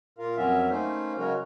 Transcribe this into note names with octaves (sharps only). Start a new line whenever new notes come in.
A#2 F4 A#4 F5
F2 F#3 B3 C#4 A#4 E5
A3 A#3 C#4 D#4 C5
C#3 F#3 G#3 C#4 F#4 A#4